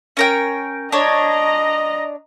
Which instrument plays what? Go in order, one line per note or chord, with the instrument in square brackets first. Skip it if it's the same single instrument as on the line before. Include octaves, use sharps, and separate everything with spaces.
[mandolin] C#4 A#4 G5
[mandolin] D4 C#5 [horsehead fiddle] D#5 A#5